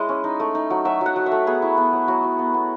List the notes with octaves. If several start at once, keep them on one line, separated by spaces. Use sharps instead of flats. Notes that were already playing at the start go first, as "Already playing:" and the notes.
Already playing: G#3 E4 C#5 D#5
C#4
D#4
A3
D#4
F#3
F#3 E5
F#3 F#5
F#3
E5
A3
B3 G#4
E4
B3
F#3
F#3 F#4
F#3
B3
B3